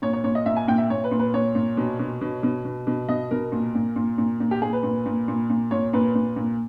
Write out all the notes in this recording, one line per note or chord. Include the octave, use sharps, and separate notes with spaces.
A#2 C#5
C#5
A#2 C#5
D#5
A#2 E5
G#5
A#2 G5
E5
A#2 C#5
B4
A#2
B4
A#2 C#5
A#2
B2
B2
B2
B2
B2
B2
B2 D#5
B2 A#4
A#2
A#2
A#2
A#2
A#2
G4
A#2 G#4
B4
A#2
A#2
A#2
A#2
A#2 C#5
A#2 B4
A#2
A#2